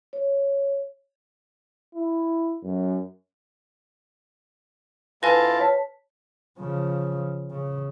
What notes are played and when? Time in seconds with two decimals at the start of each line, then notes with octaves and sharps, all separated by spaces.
0.13 C#5
1.95 E4
2.63 F#2
5.23 D2 E4 F4 B4 G#5 A5 A#6
5.60 C#5 A5 B6
6.59 C#3 F3
7.51 C#3